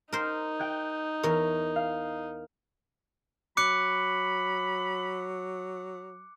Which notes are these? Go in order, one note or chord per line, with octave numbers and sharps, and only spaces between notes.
D#4 A#4 C5
G5 F#6 G6
E2 A#4 C#5
F5
F#3 B5 D6 F#6 C#7